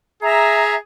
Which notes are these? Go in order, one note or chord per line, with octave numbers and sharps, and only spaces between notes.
G#4 E5 A#5